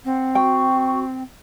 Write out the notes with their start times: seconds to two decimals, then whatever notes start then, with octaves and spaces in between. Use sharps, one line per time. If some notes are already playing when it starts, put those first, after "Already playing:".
0.05 C4 F#5
0.35 F#4 G5 C#6